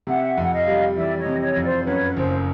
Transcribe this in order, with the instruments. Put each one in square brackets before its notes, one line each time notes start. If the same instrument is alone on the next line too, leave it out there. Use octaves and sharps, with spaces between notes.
[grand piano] C3 [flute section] E5 F#5
[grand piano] F2
[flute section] F#5
D#5 F5
[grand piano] G3
[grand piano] E3 [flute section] D5 E5
[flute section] C#5 D#5
[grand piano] C3
[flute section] C#5 D#5
[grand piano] F2
[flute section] C5 D5
[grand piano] F#2 [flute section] B4 C#5
[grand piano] F#1 [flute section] C5